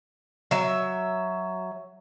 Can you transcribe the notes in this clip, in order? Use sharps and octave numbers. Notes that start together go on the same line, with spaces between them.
F#3 E5